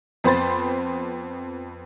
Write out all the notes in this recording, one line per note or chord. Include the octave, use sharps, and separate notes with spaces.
F2 B3 C5 B5 C6 A6